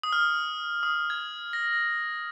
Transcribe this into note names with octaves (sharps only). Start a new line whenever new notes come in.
D#6
F6
D#6
G#6
A#6